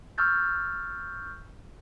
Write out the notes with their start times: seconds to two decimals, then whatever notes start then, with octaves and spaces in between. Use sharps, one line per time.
0.18 C#6 E6 F6 G6 A6